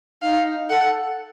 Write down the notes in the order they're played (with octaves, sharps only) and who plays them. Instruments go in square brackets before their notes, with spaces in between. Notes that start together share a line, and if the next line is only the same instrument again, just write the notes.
[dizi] D#4 [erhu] F5
[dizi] A4 [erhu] F#5